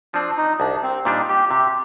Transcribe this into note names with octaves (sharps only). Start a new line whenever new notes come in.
F3 C4 D4
D#4
C2 D4
C4
A#2 G3 D4 D#4
G4
C3 G4